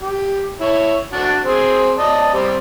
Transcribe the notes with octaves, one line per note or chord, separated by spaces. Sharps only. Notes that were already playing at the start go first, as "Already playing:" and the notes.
G4
E4 C#5
D4 F#4
C4 G#4
D5 D#5 A5
G3 C4 G4